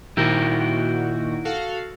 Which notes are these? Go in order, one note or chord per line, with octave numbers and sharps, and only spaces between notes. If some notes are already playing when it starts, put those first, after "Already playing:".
A#2 D#3 E4 F#4 G4 A#4
F#4 A4 F5